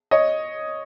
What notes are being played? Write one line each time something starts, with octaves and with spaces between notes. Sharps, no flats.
C#5 D#5